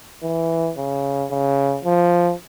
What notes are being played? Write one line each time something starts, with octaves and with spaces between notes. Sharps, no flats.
E3
C#3
C#3
F3